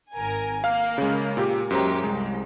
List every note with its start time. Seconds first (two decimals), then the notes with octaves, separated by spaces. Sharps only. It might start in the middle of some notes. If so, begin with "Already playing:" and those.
0.13 G#1 A#4 G#5
0.64 A#3 F5 F6
0.98 C#3 G#3
1.37 A#2 G4
1.70 F#2 F#3 G#3 G4 C5 A#5
2.04 C2 G#3